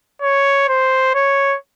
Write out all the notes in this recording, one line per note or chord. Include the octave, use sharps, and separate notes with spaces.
C#5
C5
C#5